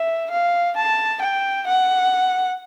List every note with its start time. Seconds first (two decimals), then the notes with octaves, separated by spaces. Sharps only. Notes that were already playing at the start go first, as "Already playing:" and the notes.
Already playing: E5
0.31 F5
0.76 A5
1.22 G5
1.67 F#5